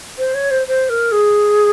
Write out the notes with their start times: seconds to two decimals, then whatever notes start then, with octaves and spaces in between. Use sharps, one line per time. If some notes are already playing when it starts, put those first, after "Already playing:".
0.18 C5
0.34 C#5
0.51 C5
0.67 C5
0.89 A#4
1.12 G#4